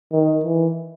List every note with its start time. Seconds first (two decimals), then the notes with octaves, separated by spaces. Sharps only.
0.12 D#3
0.44 E3